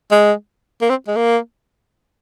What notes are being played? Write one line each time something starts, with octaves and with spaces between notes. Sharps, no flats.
G#3
A#3
C4
G#3
A#3